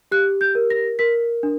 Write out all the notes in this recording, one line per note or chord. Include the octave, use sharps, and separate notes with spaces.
G4 F#6
G6
A#4
A#6
A#4 B6
D4